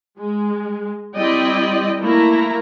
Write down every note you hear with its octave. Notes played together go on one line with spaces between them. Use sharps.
G#3
G3 C4 E4 D5 D#5 G5
A3 A#3 E4 A#5